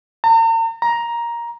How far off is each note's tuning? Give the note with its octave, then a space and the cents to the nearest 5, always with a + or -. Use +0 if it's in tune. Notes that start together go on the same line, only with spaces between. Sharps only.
A#5 -45
A#5 +10